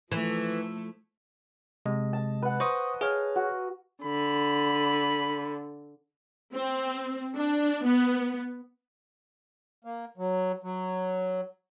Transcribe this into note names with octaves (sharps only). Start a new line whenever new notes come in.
E3 F3 A3 A4
C3 G#3 D#5
A5
B4 F#5
C5 D#5 C#6 D#6
G#4 C#5 F5
F#4
D3 B5
C4
D4
B3
A#3
F#3
F#3